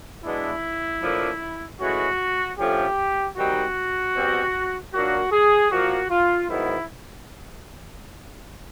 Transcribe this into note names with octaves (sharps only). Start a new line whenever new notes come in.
B2 G#3 B3 D4 E4
A2 F3 A#3 D4
A2 E3 G#3 C#4 F#4
D3 F3 A3 C#4 G4
D#3 G3 C4 D#4 F#4
B2 G3 C4
A#2 F#3 A#3 D4 F#4
G#4
A#2 F3 A#3 F#4
F4
G#2 D#3 F#3 B3 E4